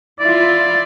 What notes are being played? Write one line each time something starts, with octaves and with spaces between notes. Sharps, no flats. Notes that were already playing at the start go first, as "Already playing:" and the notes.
E4 F4 D5